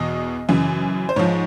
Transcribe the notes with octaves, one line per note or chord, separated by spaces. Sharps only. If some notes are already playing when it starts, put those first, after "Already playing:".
Already playing: E2 B2 D#5
F#2 C#3 E3
C5
G#2 F3 C#5